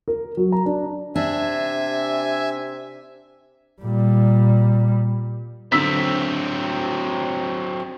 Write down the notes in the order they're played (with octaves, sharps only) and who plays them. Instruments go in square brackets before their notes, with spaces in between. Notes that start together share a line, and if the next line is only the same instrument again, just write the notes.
[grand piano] A#4
F#3
A#5
D4
[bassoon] C3 [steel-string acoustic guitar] D4 [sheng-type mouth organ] E5 G#5
[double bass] A#2 G3
[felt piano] D3 E6 B6 [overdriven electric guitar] F#3 C4